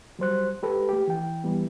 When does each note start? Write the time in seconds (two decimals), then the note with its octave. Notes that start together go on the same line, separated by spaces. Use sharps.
0.19 F#3 G3 C5 F#6
0.62 G#3 G4 A4 B4
0.89 A3 G4
1.08 E3 G5
1.44 E3 G3 B3